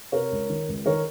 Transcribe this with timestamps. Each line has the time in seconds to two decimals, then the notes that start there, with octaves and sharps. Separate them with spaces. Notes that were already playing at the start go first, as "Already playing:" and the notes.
0.12 C3 A#4 C#5
0.31 C#2
0.50 D#3
0.68 C#2
0.86 D#3 A#4 C#5